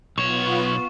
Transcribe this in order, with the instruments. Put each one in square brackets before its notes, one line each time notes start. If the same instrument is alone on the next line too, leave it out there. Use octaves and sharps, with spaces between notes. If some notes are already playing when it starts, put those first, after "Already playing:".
[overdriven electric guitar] B1 C#5 [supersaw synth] B3 F4 [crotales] C#6